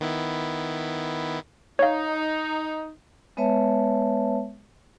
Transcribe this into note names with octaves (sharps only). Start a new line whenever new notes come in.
D#3 B3 E4
D#4 C#5 F5
G#3 B3 B4 C#5 E5 A5